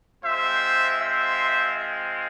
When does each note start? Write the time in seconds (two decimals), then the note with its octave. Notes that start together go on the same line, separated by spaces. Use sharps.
0.23 G#3 C4 F4 C5 E5
1.00 C5 E5